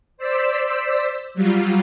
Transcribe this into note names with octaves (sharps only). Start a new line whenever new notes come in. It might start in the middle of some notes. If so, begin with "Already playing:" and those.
C5 D5 E6 B6
F#3 G3 F4